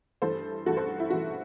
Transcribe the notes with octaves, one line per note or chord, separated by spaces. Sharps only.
G2 E3 A3 A4 C5
G2 E3 A3 F#4 A4
A4 C5
E4
G2 E3 A3 F#4